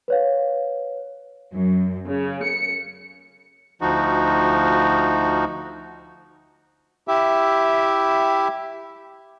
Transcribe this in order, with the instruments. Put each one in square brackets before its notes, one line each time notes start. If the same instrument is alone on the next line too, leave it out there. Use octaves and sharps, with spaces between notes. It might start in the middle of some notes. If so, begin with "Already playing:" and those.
[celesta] B4 C#5 F5
[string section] F#2
C#3
C#7
[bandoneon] D2 F3 D#4 F#4
[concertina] E4 G4 E5